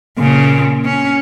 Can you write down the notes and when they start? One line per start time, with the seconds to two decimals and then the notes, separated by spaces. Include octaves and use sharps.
0.18 A#2 C#3
0.85 C#4